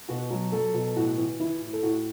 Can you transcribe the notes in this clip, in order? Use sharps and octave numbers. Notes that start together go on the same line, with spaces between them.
B2 F#4
F#3
F#3 A4
B2
A2 F#4
E3
E3 E4
A2
A4
A2 F#4